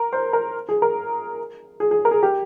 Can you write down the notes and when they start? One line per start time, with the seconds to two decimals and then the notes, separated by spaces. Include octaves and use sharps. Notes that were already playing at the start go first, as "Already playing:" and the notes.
Already playing: A#4
0.13 C5
0.33 A#4
0.69 G#4
0.82 A#4
1.80 G#4
1.91 G#4
2.05 A#4
2.11 G#4
2.23 G4